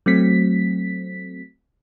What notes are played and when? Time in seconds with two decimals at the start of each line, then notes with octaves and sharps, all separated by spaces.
0.06 F#3 A3 C4 B6